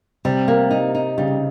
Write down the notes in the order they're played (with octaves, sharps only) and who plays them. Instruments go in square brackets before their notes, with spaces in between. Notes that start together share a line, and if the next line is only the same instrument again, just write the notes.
[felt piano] C3 [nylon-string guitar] G3
[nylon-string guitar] A#3
D#4
D#4
[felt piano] C#3 [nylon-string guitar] G3